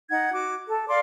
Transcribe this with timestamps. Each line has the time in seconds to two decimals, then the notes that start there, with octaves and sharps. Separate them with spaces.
0.09 D#4 F#5 G#6
0.32 F#4 D6
0.67 A4
0.88 D5 F5 C6 D6